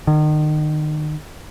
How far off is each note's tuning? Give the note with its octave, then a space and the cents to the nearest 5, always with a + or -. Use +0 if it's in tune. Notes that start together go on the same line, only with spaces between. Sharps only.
D#3 -35